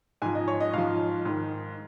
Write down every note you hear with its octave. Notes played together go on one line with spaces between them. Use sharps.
G#2 F3 G#5
D#5
C#5
D#5
G#2 F3 F5
G#2 D#3